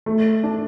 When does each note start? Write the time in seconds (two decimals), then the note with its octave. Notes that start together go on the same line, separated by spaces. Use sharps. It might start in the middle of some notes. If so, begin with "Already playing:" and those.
0.06 A3
0.43 D4